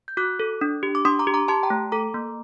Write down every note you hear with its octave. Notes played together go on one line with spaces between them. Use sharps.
G6
F#4 D6 F#6
A4
D4
G4
D6
D4 C6 D#6
A#5 D6
G4
A#5 D6
G4 A5 C6
G5 A#5
A3
A4 A#5 D6
A#3